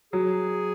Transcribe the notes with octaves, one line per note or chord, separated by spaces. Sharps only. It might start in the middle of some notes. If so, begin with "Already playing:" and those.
F#3 G#4